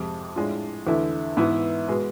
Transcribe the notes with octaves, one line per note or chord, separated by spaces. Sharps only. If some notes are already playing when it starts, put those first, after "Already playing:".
Already playing: F2 C3 G#3
A2 G#3 D4 F4
E2 D3 A3 E4
G#2 E3 B3 E4
B2 G#3 B3